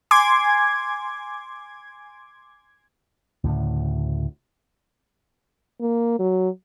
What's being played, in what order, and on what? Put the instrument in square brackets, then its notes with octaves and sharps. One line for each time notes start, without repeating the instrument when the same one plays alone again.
[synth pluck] G#5 C6 D6 G#6
[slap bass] D2 A2 C#3
[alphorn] A#3
F#3